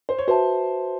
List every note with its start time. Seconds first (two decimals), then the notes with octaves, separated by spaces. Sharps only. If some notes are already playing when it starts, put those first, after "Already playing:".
0.09 C5
0.19 C#5
0.28 F#4 B4 C5 E5 A5